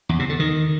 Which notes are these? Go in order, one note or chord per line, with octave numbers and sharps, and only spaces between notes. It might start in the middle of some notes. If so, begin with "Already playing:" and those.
E2
C3
D3
D#3